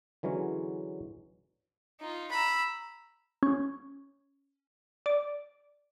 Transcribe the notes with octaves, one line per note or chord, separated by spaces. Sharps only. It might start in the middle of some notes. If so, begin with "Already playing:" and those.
D3 E3 F#3 G#3 C#4
D#4 F4
A#5 B5 E6
C#4
D5